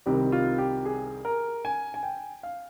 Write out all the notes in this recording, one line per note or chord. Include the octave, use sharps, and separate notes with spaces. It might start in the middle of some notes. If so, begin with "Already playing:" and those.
C2 C3 D#3 G3 C4 G4
F4
G4
G#4
A#4
G#5
G#5
G5
F5